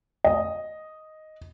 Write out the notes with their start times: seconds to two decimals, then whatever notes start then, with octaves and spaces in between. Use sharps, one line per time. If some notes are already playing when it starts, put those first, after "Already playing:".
0.24 D#5